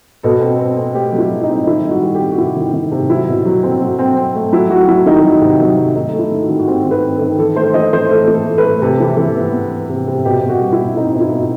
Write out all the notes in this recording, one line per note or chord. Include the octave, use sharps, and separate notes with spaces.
B2 A4
C4
C4
C4
A3 G4
F#3
E4
F#3
D#4
C4
D#3 E4
G3
F#4
G3
G4
C4
F#4
C3 E4
D#3
D#3
C3
F#3 E4
B2
F#3
C4
F#3
C4
C4
A3
F#3 E4
F#3 F#4
F#3 E4
D#3 D#4
F#3
C3
F#3
C3
A3 D#4
A3
E4
D#3
F#4
D#3
F#4
C4 G4
D#3
B4
C4
A4
D#3
E3 A4
A3 C5
E3 D#5
E3 C5
A3 A4
E3
A4
A3
B4
A3
C3 A4
E3
E3
B3
B3
B3
C3
C3
B2 G4
B2
F#4
G3
E4
B2
C4 D#4
B2
E4
B2